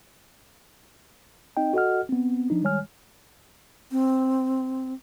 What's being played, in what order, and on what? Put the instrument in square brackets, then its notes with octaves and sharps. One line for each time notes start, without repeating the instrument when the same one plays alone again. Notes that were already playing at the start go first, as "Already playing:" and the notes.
[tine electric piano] C4 D#4 D#5 G5
F#4 A4 D#5 F#5 F6
B3 C4
F3 D4 D#4
D#3 G3 G#3 C#5 G#5 F6
[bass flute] C4